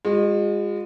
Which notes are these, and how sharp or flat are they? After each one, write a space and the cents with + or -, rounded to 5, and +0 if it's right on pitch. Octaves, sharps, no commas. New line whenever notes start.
G#3 -30 F4 +35